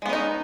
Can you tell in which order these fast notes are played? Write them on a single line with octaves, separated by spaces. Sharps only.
G#3 B3 C#4 D#4